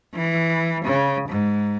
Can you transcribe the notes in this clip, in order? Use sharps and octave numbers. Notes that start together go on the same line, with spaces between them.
E3
C#3
G#2